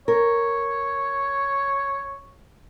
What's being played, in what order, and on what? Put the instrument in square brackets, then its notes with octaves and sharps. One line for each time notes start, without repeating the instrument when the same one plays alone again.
[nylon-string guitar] A#4 [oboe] C#5